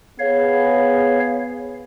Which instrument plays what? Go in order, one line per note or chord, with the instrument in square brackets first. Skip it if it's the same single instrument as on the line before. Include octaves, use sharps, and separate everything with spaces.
[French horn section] B3 G#4 [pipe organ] C#5 F5